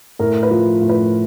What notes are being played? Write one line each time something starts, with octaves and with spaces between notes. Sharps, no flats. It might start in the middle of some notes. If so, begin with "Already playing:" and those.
A2 A#4
B4
F3
A2
B4